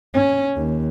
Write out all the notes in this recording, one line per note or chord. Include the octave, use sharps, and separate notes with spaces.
C#4
D#2